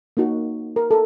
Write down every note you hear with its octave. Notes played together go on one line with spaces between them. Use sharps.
A#3 D#4 F#4
A#4
A4